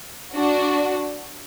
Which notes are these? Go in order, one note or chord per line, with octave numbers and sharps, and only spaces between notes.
D4 F#4